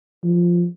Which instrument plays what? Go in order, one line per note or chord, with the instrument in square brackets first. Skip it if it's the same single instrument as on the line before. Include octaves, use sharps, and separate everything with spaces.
[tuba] F3